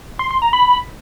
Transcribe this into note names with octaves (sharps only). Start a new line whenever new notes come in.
C6
C6
A#5
B5